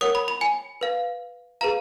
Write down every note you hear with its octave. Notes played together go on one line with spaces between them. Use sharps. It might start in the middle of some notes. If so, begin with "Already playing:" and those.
A#4 C#5 F#5 D#6
B5
B5
G#5
B4 F5
G#4 B4 F5 A#5